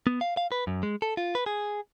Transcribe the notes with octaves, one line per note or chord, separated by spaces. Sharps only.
B3
F5
F5
B4
F#2
G#3
A4
F4
B4
G#4